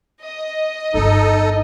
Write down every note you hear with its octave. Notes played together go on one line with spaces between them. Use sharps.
D#5
G1 D4 D#4 A4